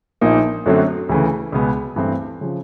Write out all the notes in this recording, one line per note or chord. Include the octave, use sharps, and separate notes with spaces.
A#1 A#2 F3 A#3 D#4
F#2 D3 F#3 A3 C4
D2 C#3 E3 A3
C#2 B2 G#3 B3
G2 E3 A3 C4
C#3 F3